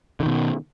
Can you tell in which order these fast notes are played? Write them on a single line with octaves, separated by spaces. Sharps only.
D3 D#3 B2